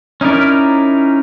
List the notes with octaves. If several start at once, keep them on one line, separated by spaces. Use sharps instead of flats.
C#4 D#4 E4 A#4 D5